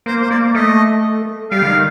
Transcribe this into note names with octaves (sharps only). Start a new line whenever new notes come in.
A#3 C5
C5
A#3 D5
A3 D#5
G3 F5
D3
D#3